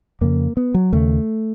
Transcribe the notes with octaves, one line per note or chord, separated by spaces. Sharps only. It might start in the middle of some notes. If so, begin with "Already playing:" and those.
F2 C#3 A#3
B3
F#3
D#2 C#3 A3